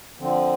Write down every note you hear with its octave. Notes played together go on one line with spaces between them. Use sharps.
D3 F3 C4